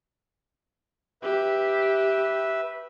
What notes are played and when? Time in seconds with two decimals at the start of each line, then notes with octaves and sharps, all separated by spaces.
1.23 G4 B4 E5